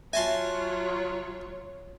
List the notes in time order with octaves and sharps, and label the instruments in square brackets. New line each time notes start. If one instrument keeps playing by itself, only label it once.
[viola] F#3 F4 [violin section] C#5 [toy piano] E5 [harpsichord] G#5 A5 C6